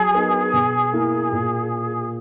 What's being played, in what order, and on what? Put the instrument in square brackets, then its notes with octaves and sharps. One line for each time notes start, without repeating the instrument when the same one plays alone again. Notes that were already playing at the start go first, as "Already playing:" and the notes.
Already playing: [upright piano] F#3 [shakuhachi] G#4
[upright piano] B3 D#4 A#4
B2
A#3 E4 A#4
A#2